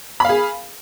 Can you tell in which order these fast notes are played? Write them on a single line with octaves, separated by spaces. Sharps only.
B5 F5 G#4